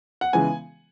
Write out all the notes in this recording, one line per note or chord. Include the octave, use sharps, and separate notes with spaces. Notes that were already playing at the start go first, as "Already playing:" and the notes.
F#5
C#3 E3 G#3 B3 G#5